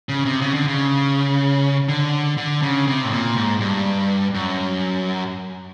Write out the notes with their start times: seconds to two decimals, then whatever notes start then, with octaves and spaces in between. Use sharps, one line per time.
0.09 C#3
0.25 C3
0.41 C#3
0.54 D3
0.68 C#3
1.89 D3
2.37 D3
2.62 C#3
2.87 C3
3.04 A2
3.12 A#2
3.36 G#2
3.60 G2
4.35 F#2